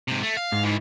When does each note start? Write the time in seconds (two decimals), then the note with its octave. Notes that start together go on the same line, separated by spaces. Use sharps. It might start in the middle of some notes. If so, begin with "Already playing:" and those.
0.08 G#2 C3
0.23 A3
0.37 F5
0.52 G#2
0.64 D#3 E3